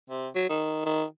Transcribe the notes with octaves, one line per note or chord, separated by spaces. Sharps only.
C3
F#3
D#3
D#3